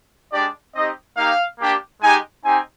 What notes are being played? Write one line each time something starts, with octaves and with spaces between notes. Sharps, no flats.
G#3 D4 G4 D5
C4 D#4 G4 D#5
A#3 D#4 G4 F5
A#3 D4 G4
G#3 D#4 G4 G#5
C4 D#4 G4 G#5